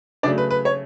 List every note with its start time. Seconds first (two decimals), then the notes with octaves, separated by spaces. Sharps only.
0.23 C#3 F#3 A3 D4 D5
0.38 B4
0.51 B4
0.65 C#5